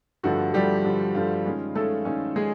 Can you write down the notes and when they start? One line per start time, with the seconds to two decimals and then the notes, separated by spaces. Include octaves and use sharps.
0.23 G2 D3 F3 A3 F#4
0.54 G2 D3 F3 G3 A3 G4
0.84 G2 D3 F3 A3
1.15 G2 D3 F3 A3 F4
1.45 D#3 G#3 C#4
1.75 D#3 G#3 A3 C#4 A4
2.05 D#3 G#3 C#4
2.36 D#3 G#3 C#4 G#4